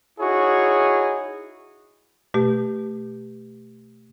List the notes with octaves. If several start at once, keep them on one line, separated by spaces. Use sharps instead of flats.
D#4 E4 F#4 G#4 C#5
B2 A3 G4